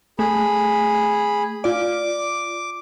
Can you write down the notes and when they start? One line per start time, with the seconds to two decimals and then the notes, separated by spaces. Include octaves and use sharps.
0.19 A3 G#4 B5
1.64 F4 D5 D6